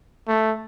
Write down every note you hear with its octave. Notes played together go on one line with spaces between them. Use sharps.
A3